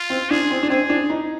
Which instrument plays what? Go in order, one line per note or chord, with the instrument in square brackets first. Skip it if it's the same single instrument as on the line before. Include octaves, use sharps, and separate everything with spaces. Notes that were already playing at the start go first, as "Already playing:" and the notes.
Already playing: [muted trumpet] F4
[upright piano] C4
[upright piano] D4 [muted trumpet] G#4
[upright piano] C4
D4
[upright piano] C4 [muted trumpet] G#4
[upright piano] D4
D#4